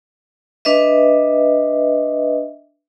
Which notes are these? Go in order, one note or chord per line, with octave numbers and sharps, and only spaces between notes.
D4 B4 D#5 E5